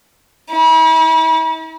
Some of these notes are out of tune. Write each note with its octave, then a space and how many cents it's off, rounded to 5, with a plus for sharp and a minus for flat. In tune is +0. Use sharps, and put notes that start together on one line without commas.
E4 -45